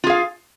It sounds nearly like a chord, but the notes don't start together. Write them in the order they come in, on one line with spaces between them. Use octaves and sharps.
F4 G#4 F5